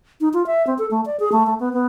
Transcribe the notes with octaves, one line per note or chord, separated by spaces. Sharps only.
D#4
F4
E5
C4
A4
A3
D5
G#4
A3
A3
B3
B3